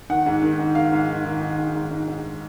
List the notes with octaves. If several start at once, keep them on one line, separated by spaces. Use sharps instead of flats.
D#3 F#5
G#2
D#3
G#2
D#3 F5
G#2
D#3
D#3
D#3
G#2
G#2
G#2
G#2